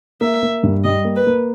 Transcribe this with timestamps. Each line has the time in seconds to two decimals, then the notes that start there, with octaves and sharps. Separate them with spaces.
0.21 A#3 E5
0.43 A#3
0.63 G2
0.84 G3 D#5
1.05 A#3
1.16 B4
1.27 A#3